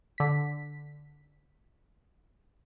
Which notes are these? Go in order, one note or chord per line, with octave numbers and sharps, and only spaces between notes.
D3 B6